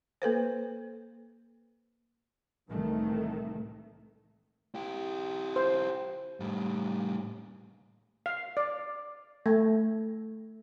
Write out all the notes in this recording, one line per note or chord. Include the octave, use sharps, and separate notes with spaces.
A#3 A4 B4 C5
C2 A2 D#3 E3 A3
E4 G4
C5
A2 G3
F5
D5
A3